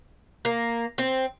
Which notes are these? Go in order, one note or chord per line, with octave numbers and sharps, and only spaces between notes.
A#3
C4